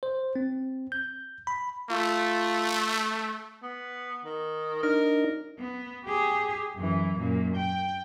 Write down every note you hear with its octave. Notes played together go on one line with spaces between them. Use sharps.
C5
C4
G6
B5
A3 F4
B3
D#3
D4 D#4 A#4
B3
G4 G#4
F#2 E3
F#2 A#2
G5